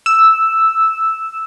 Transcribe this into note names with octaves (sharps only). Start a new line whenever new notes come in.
E6